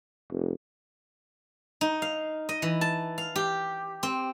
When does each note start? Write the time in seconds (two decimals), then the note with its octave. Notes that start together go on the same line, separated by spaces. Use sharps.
0.30 F1
1.81 D#4
2.02 F5
2.49 D#5
2.62 E3
2.81 A5
3.18 F5
3.36 G4
4.03 C4